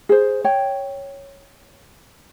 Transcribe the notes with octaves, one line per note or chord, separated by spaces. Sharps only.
G#4 C5
C#5 G5